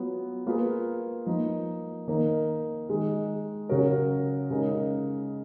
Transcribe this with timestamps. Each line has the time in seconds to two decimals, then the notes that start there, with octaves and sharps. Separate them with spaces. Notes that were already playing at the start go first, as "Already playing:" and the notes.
Already playing: F#3 B3 F4
0.46 A#3 F4 G#4 B4
1.26 F3 A#3 D#4
2.08 D#3 A#3 D#4 A#4
2.88 D#3 G#3 D#4
3.69 C#3 F#3 C#4 F#4 A#4
4.50 C#3 G#3 D#4 A#4